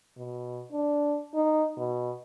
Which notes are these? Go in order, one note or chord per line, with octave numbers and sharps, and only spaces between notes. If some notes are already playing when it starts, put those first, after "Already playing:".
B2
D4
D#4
B2